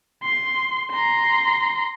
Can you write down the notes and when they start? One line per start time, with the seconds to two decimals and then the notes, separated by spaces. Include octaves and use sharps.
0.23 C6
0.91 A#5 C6